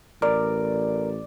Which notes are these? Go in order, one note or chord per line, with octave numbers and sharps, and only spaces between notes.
A1 A#4 D5